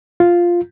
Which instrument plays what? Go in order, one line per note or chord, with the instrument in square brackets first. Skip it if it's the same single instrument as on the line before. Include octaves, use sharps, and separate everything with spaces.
[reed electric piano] F4